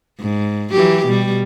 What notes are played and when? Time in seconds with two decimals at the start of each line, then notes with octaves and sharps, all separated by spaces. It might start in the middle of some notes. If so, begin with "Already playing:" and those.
0.20 G#2
0.72 E3 F#3 G4
1.06 B2 G3